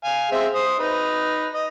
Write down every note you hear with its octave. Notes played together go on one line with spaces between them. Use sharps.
F5 G#5
G#3 C4 E5
C5 D#6
D#4 B4
D#5